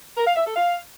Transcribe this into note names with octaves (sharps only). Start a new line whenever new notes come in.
A#4
F5
E5
A4
F5